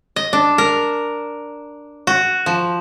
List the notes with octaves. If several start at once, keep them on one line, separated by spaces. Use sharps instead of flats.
D#5
D4
A#4
F#4
F3